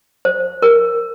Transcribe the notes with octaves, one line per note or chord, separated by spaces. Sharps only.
C5
A#4